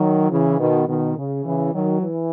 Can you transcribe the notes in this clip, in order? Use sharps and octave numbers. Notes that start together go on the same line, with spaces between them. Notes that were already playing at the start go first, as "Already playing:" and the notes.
Already playing: D#3 F#3
C#3 E3
B2 D#3
B2 D#3
C#3
C#3 E3
D#3 F#3
E3